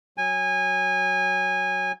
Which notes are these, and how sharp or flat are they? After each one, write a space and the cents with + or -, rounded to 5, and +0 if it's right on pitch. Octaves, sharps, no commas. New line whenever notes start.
F#3 +0 G#5 -20